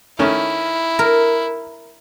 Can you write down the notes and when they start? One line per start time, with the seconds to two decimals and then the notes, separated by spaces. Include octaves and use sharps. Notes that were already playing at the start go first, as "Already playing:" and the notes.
0.19 D#3 A3 C#4 E4
0.99 A#4